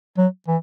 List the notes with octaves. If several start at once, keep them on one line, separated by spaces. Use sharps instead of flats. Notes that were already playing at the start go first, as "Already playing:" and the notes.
F#3
E3